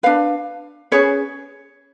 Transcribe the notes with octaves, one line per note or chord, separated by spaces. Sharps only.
D4 F#4 B4 F5
C#4 G#4 B4 C#5